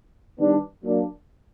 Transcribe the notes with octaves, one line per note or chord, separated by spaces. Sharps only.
D#3 G3 B3 D4
F#3 A#3 D4